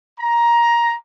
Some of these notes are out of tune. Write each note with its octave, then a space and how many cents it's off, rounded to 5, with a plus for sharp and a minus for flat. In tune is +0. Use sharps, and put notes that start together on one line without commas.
A#5 +15